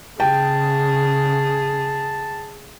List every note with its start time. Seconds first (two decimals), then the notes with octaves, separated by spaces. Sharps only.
0.20 C#3 G#4 G5 A5